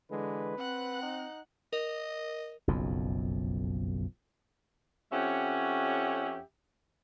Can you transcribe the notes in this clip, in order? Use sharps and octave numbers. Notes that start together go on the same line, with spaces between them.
D3 E3 G#3 B4
C4 F#5 F#6
D#4
A#4 D#5
F#1 B1 F2
F2 C#4 G4 C#5 E5 F#5